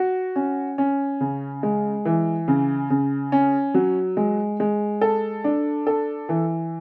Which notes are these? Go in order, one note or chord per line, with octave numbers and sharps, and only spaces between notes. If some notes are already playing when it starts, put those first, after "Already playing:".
Already playing: F#4
C#4
C#4
C#3
G#3
E3
C#3
C#3
C#4
F#3
G#3
G#3
A4
D4
A4
E3